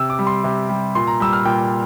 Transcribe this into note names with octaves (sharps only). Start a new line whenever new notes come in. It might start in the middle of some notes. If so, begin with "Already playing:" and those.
Already playing: C3 E6
D6
G3
C6
C3
G3
A#2 C6
A#5
G3 E6
F6
A#2 G5